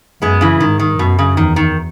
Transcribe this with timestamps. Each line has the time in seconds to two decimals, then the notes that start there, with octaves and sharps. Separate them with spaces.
0.22 F#2 G#3 B3
0.41 C#3 E3
0.60 G#2 D#3
0.79 D#3
0.99 F#2 B2
1.19 C#3
1.37 E2 D#3
1.56 D#3